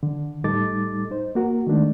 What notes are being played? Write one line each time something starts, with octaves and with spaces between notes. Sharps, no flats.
D3
A2 G3 D#4 A4 D6 A6
D#4 C5
A#3 F#4 A#4
D#3 G#3 A3 D4 D#4